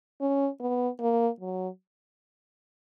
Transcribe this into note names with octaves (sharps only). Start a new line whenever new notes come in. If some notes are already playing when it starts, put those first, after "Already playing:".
C#4
B3
A#3
F#3